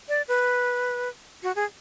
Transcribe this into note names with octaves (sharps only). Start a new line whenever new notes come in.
D5
B4
F#4
G#4